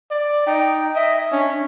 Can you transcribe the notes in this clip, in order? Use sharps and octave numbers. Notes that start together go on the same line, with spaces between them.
D5
D#4 G5
D#5 E5
C#4 D4